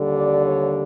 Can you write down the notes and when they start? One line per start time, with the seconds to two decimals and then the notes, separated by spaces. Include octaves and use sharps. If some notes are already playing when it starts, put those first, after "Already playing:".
Already playing: D#2 D3 G3
0.16 D5
0.44 C#5